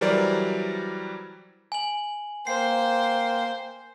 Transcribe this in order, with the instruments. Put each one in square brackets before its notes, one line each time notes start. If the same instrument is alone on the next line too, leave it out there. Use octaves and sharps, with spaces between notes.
[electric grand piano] E3 F#3 G3 A#4 C5 D5
[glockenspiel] G#5 F#7
[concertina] A#3 G5 [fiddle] C5 [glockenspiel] C7